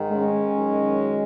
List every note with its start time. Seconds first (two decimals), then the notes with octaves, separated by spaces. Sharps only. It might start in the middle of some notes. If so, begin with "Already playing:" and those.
Already playing: G#2 D#3
0.12 G#3 C#4
0.56 F#2 D#3